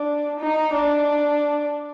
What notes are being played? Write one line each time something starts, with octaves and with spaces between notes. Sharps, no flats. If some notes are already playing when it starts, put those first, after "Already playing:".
Already playing: D4
D#4
D4